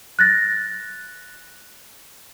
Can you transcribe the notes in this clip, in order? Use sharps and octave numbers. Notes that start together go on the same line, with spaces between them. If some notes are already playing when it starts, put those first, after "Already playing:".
F#6 A6 A#6